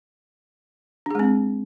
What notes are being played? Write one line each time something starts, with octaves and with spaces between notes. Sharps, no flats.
G#3 C4 D4 G#4